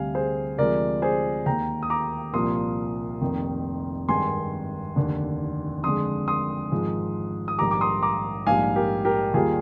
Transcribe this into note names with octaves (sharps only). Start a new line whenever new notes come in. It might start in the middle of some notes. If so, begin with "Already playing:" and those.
Already playing: D2 C3 G3 F5 G#5
G#4 C5
D2 C3 F3 G#3 A#4 D5
G#4 C5
D#2 D#3 A#3 G5 A#5
D#6
A#5 D6
C2 A#2 F3 A#3 C6 D#6
F1 F2 D#3 A#3
G#1 G2 D#3 G#3 G#5 C6
F1 D#2 D3
F2 D3 G#3 C6 D#6
C6 D#6
G#1 G#2 F3 G#3
D#6
A#1 G#2 D#3 G3 A#5 D6
D6
C6 D#6
A#5 D6
A#1 G#2 G3 A#3 F5 G#5
G4 A#4
G4 A#4
D#2 D#3 G3 A#3 F4 G#4